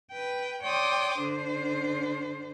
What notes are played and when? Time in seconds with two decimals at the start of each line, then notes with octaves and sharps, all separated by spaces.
0.13 B4 G5
0.65 C#5 D5 G5 C6 D6 D#6
1.20 D3 D4 C5